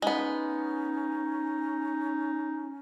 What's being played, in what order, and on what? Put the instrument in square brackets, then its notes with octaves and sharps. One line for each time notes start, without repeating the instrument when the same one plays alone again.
[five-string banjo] G#3 B3 [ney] C#4 [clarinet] D#4